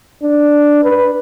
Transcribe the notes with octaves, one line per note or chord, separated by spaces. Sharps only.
D4
B4